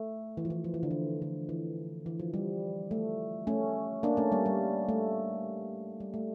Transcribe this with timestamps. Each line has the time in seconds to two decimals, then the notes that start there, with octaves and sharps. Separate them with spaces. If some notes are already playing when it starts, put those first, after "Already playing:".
Already playing: A3
0.37 E3
0.45 F3
0.50 E3
0.64 F3
0.74 E3
0.83 D3
0.91 E3
1.22 D3
1.49 E3
2.06 E3
2.20 F3
2.34 G3
2.91 A3
3.47 A3 C#4
4.03 A#3 D4
4.17 A3 C#4
4.32 G3 A#3
4.46 G3
4.89 A3
6.00 G3
6.14 A3